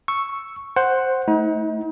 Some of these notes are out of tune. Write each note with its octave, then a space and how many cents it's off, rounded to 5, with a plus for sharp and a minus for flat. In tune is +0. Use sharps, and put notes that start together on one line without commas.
C#6 +0 E6 +0
C5 +5 F#5 +5
A3 +0 D#4 +40